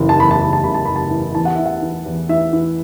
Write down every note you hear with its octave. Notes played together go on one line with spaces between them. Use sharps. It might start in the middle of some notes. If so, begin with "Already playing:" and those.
Already playing: F#1 E2 E3
A5
E2 B5
A5
F#1 B5
A5
F#1 B5
A5
F#1 B5
A5
E3
E2 A5
F#5
E3 E5
F#5
E3
E2
E3 E5
E3